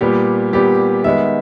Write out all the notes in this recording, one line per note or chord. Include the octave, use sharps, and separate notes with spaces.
A#2 G3 B3 G4
A#2 G3 B3 G4
D#3 G#3 B3 E5